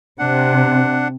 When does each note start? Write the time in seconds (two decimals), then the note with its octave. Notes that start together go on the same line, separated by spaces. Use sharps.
0.19 C3 D4 F#5